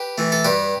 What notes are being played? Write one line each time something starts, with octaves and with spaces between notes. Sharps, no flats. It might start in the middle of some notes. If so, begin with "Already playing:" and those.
Already playing: G4 B4
E3 A3
A4
G2 G4 B4